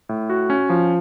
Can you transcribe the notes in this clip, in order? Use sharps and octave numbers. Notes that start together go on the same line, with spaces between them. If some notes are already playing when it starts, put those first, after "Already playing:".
A2
F#4
C#4
F3